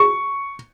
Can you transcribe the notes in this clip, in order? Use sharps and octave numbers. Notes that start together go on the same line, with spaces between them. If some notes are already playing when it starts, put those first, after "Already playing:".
Already playing: C#6